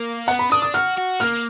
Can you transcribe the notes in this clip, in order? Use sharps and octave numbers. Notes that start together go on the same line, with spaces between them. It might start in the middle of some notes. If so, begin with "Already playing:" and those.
Already playing: A#3
B3 F#5
B5
D4 D#6
D#6
F#4 F6
F#4
A#3 F6